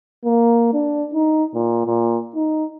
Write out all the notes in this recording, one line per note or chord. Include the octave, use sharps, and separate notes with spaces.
A#3
D4
D#4
A#2
A#2
D#4